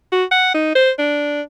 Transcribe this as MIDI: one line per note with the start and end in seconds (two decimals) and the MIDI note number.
0.12 0.24 66
0.31 0.53 78
0.54 0.73 63
0.75 0.91 72
0.98 1.42 62